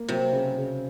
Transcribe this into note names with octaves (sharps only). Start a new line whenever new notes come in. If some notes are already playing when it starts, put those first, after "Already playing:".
Already playing: A#3
C3 F#3
C#3
C#3